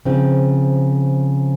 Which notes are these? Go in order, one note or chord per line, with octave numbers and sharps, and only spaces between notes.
C#3 F3 C4